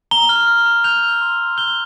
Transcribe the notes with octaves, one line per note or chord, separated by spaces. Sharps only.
A#5 G7
F6
F6
A#5
G6 F7
E6
C6
C6
G6 G7